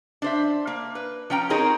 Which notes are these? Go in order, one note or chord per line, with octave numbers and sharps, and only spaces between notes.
D4 C5 E5
A#3
B4
F3 C#4 G5 A#5
C4 D#4 G#4 A#4 C#5